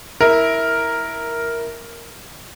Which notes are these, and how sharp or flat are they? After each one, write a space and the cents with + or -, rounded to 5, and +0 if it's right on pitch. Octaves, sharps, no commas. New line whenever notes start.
E4 -15 A#4 +0